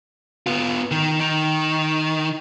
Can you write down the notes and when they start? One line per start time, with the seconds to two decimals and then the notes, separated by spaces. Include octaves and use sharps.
0.47 B3 F4
0.91 D#3
1.20 D#3